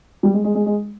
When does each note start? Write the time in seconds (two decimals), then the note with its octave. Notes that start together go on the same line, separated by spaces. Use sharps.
0.23 G3
0.33 G#3
0.44 G#3
0.55 G#3
0.66 G#3